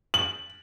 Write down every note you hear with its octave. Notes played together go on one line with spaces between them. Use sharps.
F#7